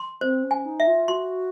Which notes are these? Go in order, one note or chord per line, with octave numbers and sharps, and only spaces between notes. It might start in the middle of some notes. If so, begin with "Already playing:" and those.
Already playing: C6
C4 C5
C#4
G#5
D#4
E5
F4
F#4 C6